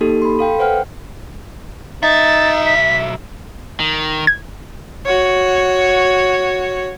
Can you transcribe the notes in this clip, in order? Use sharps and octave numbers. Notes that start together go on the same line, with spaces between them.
A#3 D#4 G4 A4
B5 C6
A4 F5 G5
B4 C5 F#5 G5 F6
B1 D#4 E5 A6
B6
D#3
G#6
F#4 C#5